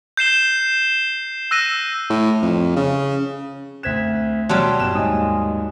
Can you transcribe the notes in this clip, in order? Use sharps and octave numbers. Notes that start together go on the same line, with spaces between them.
G6 C7 E7 G7
E6 F#6 A#6 D#7
A2
F2
C#3
D2 C4 F#6 G#6 B6 E7
B2 F#3 G3 C#5 A5 C6 F6 E7
G1 E7
D#2 G#2 D#5 G#5 D#6